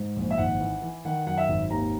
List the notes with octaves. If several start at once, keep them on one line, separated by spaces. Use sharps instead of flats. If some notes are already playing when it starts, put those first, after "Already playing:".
Already playing: G#2
A#1
E5
G#1 F#5
E3
E3
D#3 F#5
F#2 F#5
E5
G#1
D#2 A#5